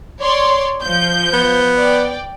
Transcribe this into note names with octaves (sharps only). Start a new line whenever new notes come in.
C#5 D5 C6
F3 G6
B3
D5 G5